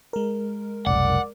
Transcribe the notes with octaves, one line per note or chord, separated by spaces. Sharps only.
G#3 A#4
F1 B1 D5 F#5